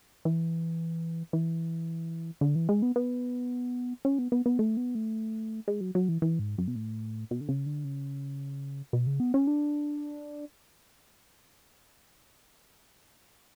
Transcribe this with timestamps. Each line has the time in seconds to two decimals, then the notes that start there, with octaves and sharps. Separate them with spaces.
0.25 E3
1.33 E3
2.41 D3
2.55 E3
2.69 G#3
2.82 B3
2.96 B3
4.05 C#4
4.19 B3
4.32 B3
4.46 B3
4.59 A3
4.77 B3
4.95 A3
5.68 G#3
5.81 F#3
5.95 F#3
6.09 E3
6.22 E3
6.39 G#2
6.58 F#2
6.68 B2
6.76 A2
7.31 B2
7.41 D3
7.49 C#3
7.66 D3
7.84 C#3
8.93 B2
9.07 C#3
9.20 B3
9.34 C#4
9.47 D4